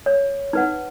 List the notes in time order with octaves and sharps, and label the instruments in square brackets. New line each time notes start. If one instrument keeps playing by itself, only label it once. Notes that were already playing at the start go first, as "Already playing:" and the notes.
[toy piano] C#5
D#4 B4 F#5